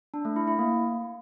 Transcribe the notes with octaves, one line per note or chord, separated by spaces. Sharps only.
D4
A3
E4
E4
A#3